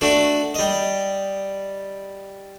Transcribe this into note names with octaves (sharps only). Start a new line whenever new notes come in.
A3 D4 F#4
G3 D#5